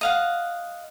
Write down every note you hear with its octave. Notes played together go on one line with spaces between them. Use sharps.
D#5 F5 F#5